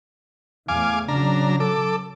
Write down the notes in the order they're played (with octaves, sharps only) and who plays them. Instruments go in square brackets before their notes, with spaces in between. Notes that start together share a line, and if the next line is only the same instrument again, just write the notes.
[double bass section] E2 A2 [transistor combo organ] F5 G#5 D6
[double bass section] C#3 F#3 [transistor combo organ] D4 A#5
[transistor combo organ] A4 D6